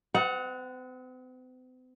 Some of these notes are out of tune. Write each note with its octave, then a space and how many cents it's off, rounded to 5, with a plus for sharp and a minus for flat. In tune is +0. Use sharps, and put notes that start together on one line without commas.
C4 -45 F#5 -5